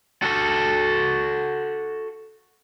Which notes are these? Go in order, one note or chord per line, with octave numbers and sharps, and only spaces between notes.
F#4 A4